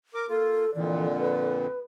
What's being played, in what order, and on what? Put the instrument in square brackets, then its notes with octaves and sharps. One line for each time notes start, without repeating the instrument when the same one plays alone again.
[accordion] A#4 D6
[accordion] A#3 F4 [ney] A4
[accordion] F2 A#2 D3 [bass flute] E3 [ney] D5
[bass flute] B4